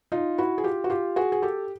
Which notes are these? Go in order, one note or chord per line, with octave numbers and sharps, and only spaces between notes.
D#4 F4
E4 F#4
G#4
F4 G4
F#4
F4 G4
F#4 G#4
G#4
G4 A4